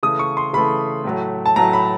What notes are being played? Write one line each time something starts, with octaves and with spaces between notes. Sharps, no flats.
C#3 E3 A3 D#6
C#6
C6
C#3 E3 A3 B5
A2 F#3 A3
A5
A2 F#3 A3 A#5
B5